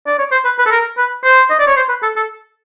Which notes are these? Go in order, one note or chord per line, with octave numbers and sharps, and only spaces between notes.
D5
C#5
C5
B4
B4
A4
A#4
B4
C5
D#5
D5
C#5
C5
B4
A4
A4